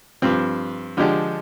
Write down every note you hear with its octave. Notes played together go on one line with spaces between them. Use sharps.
G2 F3 C4
D3 F3 G#3 D4 G4